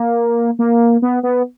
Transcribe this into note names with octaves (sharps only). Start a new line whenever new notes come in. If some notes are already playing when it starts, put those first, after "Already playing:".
Already playing: A#3
A#3
B3
B3